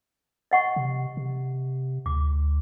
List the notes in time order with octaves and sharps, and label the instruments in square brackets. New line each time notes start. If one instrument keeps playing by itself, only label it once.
[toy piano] D#5 F#5 C#6
[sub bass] C3
C3
[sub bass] D2 [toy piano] D6